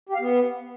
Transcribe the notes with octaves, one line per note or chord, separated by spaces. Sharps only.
G4
F5
B3